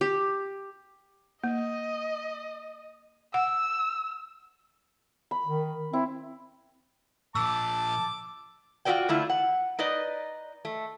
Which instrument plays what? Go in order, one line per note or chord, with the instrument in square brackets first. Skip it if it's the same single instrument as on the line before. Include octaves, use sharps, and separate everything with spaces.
[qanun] G4
[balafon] A#3 [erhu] D#5
[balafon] F#5 [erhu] E6
[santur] B5
[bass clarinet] D#3
[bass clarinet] C4 [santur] E4
[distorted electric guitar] A#2 F3 [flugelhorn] A5 [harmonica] D6 [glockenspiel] E6
[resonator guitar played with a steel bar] F4 F#4 G#4 A#4 D5 G5
D3 A3 E4 F4
F#5
D#4 B4 D5 D#5
A3